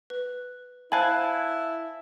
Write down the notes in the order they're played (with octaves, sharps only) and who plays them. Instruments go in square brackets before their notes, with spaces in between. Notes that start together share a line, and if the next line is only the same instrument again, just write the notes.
[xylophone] B4
[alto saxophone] E4 [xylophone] C5 F5 B5 [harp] G#5 A5 F#6